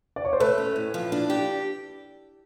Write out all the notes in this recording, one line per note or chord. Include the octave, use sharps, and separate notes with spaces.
D5
C#5
C5
A3 A4 B4
C#4
A2
F3
D4
G4